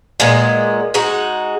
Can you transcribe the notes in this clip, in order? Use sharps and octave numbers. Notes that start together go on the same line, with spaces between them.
A#2 G#3 B3
G#3 D#4 F#4